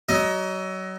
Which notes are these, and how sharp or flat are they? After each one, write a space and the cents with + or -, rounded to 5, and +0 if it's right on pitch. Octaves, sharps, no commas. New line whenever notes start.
F#3 +30 D#5 +10